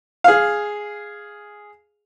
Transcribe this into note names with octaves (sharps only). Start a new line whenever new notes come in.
G#4 F5